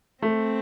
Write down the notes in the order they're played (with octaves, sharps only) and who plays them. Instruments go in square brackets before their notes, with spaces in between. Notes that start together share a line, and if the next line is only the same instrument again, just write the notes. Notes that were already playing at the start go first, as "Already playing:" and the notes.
[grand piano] A3 [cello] C4